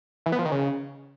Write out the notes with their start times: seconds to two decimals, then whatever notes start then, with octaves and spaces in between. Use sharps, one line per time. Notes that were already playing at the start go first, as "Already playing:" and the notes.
0.26 E3
0.32 B3
0.39 F3
0.45 D#3
0.52 C#3